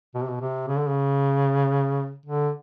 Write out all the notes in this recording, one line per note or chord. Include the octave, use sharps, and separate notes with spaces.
B2
C3
B2
C3
C#3
D3
C#3
D3